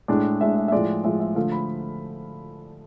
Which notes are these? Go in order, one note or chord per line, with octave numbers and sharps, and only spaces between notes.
A2 G#3 D4 D5
A2 G#3 D4 E5
E5
E5
A2 F3 G#3 D5
A2 F3 G#3 E5
E5
D3 F3 A3 F5
B5